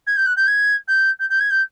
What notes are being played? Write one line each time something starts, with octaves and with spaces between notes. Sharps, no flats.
G#6
G6
F#6
G6
G#6
G6
G6
G6
G#6
G6